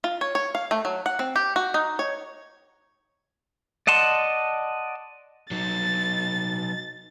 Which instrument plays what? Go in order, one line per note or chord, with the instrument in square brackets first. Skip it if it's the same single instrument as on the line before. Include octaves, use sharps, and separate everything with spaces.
[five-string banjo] F4
C#5
C#5
F5
A3
F#3
F#5
C4
G4
F#4
D#4
C#5
[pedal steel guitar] D5 D#5 F#5 A5 C6
[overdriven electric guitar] F#3 D#4 [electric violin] A6